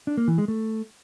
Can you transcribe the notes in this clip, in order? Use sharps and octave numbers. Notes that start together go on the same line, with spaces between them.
D4
A#3
E3
G#3
A3